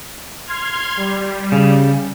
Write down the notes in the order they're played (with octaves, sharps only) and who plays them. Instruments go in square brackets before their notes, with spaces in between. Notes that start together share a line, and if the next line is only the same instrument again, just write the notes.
[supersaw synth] C6 F6 G#6
G3
[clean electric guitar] C#3